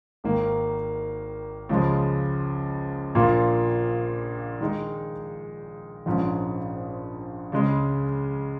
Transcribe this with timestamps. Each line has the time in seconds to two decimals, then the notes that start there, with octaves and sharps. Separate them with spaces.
0.24 G#1 G#2 D#3 A#3
1.69 C#2 C#3 F3 G#3
3.15 A#1 A#2 A#3 F4
4.61 D#3 G#3 D#4
6.06 A#1 G#2 F3 C#4
7.52 C#2 C#3 G#3